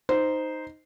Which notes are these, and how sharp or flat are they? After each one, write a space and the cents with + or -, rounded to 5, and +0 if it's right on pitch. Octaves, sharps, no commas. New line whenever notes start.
D#4 +0 C5 -10